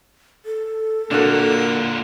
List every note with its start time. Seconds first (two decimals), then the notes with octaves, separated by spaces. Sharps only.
0.45 A4
1.11 A#2 D3 A#3 D4 E4 F#4